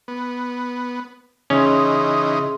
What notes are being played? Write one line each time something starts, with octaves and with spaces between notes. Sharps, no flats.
B3
C#3 E3 C#4 D#4 G#4 C6